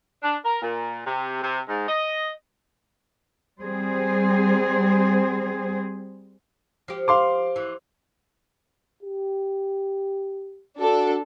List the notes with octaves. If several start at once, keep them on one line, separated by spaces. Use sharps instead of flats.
D4
A#4
A#2
C3
C3
G#2
D#5
G3 C4 G#4 C5
F3 G4
F5 C6 D6
E3
G4
D4 F#4 A4